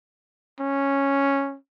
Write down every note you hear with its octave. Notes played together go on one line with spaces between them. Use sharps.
C#4